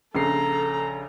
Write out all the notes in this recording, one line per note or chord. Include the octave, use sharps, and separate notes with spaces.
A#1 C#3 A4 A#5 C7